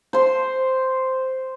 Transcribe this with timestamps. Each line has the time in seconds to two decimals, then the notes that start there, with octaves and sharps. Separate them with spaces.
0.13 C5 C6